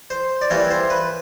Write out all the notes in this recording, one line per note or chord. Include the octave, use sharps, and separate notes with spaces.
C5
D5
E3 G3 A#3 C#5
C5
B4